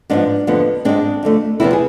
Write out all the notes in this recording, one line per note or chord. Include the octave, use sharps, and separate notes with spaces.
G#2 F3 B3 D4
F2 D3 F3 B3
G#2 G#3 C4 D4
F2 D3 A3
E2 C3 F3 B3 E4
G#4